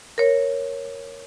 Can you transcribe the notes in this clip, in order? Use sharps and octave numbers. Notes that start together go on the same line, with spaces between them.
A#4 C#5